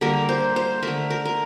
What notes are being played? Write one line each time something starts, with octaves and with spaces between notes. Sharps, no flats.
D3 G3 A#3 A#4
C5
C5
D3 A3 A#4
A#4
A#4